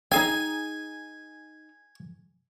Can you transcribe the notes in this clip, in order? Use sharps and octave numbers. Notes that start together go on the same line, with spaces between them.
D#4 G#4 G5 G#5